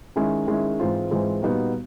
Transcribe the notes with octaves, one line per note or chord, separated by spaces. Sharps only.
D#3 G#3 C#4 E4
D#3 G#3 C#4 E4
G#2 E3 G#3 C4 F4
G#2 E3 G#3 C4 F4
A#2 G3 B3 D#4 F#4